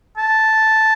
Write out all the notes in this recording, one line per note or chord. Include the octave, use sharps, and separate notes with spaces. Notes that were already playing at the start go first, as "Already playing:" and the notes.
A5